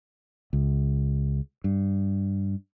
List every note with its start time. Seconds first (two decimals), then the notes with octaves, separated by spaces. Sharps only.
0.53 C#2
1.64 G2